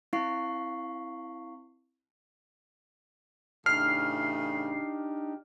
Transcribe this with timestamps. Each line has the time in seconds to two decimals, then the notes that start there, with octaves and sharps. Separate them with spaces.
0.13 C4 E4 F5 C#6 C7
3.66 A2 C#3 E3 D4 D#4 G4 F6 C7